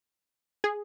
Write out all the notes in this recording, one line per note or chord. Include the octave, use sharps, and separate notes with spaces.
G#4